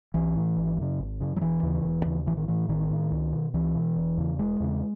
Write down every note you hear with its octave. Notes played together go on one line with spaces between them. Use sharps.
B1 E3
A2
G#1
F#2 C#3
G#1
F#2 C#3
F#3
E1 E3
D#2 C#3
E1
D#2 C#3
A1 E3
D#3
A2 E3
A1 D#3
A2
C#2
B2
C#2 E3
B2
E1
E2 C#3
E1 G#3
E2 C#3